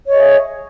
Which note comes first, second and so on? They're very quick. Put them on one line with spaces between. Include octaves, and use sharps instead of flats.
C#5 D#5 G#4 E5